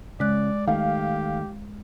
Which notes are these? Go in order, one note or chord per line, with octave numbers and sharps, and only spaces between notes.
C#3 G#3 D5 F#6
D#3 A3 G4 F5